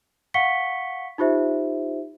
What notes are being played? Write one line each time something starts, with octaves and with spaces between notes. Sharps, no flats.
F5 F#5 C#6 B6 C#7 G7
D#4 F4 G4 C5 E5